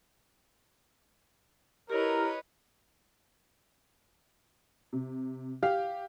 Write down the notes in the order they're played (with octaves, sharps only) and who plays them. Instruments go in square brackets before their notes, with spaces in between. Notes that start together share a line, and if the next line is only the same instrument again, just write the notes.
[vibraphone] E4 G4 [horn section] A#4 [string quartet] B4 C#5 D#5
[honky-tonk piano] C3
[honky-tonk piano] G4 [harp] F5